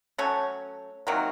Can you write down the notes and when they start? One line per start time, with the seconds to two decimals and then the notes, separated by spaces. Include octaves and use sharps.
0.18 F#3 A3 C#4 C#5
1.07 C3 D#3 F#3 A#3